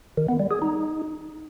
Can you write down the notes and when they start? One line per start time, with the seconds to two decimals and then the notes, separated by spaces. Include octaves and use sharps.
0.17 D#3
0.29 B3
0.40 G3
0.51 G#4
0.62 D#4